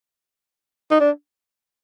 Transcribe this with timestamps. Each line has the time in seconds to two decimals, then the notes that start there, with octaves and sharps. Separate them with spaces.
0.91 D#4
1.01 D4